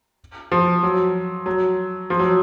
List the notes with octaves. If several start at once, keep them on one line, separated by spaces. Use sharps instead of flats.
F3
F#3
F#3
F3
F#3